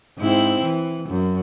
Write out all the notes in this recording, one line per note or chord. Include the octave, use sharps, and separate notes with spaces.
G#2 C4 E4
E3
F#2